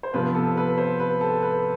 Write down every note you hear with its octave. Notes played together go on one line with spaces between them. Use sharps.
C5
C3 F3 B3 B4
A4
B4
C5
B4
A4
B4